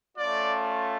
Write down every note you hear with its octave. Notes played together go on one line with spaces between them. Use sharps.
A3 C#4 F4 D5